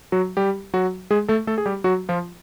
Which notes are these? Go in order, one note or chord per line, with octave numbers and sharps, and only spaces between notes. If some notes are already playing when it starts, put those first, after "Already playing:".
F#3 F#4
G3 G4
F#3 F#4
G#3 G#4
A3 A4
A3 A4
G#4
G3 G4
F#3 F#4
F3 F4